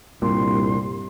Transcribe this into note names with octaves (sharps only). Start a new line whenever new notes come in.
C2 G2 A#2 C6